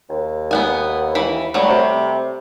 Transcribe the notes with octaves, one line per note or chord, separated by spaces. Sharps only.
D#2
B3 F#5 G#5
E3 B5
F#3 G3 A3
C3